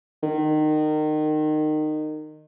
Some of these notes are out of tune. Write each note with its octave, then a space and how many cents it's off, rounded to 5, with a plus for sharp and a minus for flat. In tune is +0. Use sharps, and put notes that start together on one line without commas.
D#3 -25